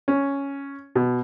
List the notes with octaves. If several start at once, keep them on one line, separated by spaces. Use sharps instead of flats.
C#4
B2